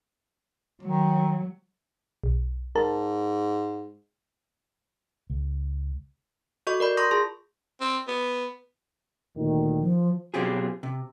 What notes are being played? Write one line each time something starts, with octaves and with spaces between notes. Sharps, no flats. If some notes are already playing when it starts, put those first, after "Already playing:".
D#3 F#3
B1
G#2 A#4 A5
C#2
F#4 A4 D#5 C#6
A#4 D5 B5 G6
A#5 C6 C#6 D#6 G6 A#6
F4 G#4 A5 C6
C4
B3
D2 A#2 D#3
F3
B2 F#3 C4 F4 G4 G#4
C3